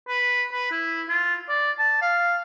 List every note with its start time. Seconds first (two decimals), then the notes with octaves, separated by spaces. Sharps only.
0.08 B4
0.53 B4
0.71 E4
1.09 F4
1.49 D5
1.79 A5
2.01 F5